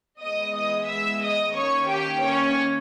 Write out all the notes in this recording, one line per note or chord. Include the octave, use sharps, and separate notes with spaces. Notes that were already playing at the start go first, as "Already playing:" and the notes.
E3 G#3 B3 D#5 D#6
D#5 D#6
E5 E6
D#5 D#6
D#3 A#3 C#4 C#5 C#6
G4 G5
C#4 C#5